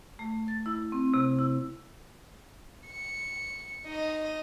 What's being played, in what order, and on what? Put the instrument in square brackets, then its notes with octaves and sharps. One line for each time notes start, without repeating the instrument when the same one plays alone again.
[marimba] A3
A6
E4
C4
C3
E4
[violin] C#7
D#4 D#5